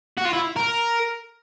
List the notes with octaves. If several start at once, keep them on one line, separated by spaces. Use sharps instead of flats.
F#4
F4
E4
A#4